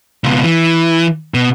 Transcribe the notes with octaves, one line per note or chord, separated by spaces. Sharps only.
C#2 B2
E3
B2